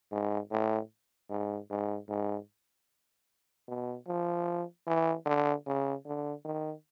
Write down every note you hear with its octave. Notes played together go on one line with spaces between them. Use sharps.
G#2
A2
G#2
G#2
G#2
B2
F3
E3
D3
C#3
D3
D#3